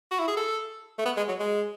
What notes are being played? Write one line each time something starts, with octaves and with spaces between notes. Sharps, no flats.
F#4
E4
G#4
A4
A3
B3
G#3
F#3
G#3